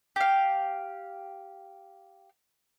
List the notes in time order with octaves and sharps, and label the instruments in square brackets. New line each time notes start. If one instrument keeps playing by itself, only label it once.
[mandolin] G4 F5